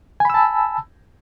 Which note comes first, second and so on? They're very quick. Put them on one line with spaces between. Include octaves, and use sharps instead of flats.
G#5 B5 E6 A5